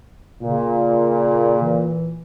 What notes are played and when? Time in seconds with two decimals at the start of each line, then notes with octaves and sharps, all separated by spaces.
0.42 A#2 C#3
1.63 E3